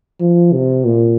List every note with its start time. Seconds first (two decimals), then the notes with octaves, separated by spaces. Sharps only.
0.20 F3
0.53 C3
0.85 A#2